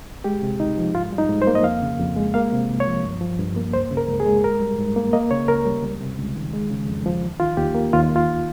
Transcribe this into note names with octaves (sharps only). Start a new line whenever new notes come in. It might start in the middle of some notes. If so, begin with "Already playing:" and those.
G#3 G4
C3
C#2 D#4
F3
G#2 F4
G3
D#4
G#2
C5
A#3
D#5
F2 F5
C#3
F2
G#3
A#3 F5
C3
C2
C#5
F3
G2
F3
G2
A#3
C#2 C5
C#3
A#4
C#2
G#4
G#3
G#2 A#4
G3
G#2
A#3
A#3 D#5
C#3 C#5
C#2 A#4
G3
C#2
C3
C#2
D#3
G#3
C#3
F2
F3
D#2
D#3 F4
D#2 G4
A#3
D#2 F4
D#3
F4